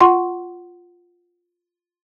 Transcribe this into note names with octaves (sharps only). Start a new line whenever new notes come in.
F4 F#5 C6